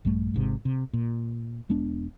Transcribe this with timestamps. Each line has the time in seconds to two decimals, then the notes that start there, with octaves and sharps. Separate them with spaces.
0.05 A#1 G2 G3 A3
0.34 G#1 G#2 C3
0.65 C3
0.93 A#2
1.69 E1 G#3 B3 D4